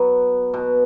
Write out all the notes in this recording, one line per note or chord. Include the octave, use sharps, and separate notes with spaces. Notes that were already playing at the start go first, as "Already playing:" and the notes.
Already playing: F#3 B3
B2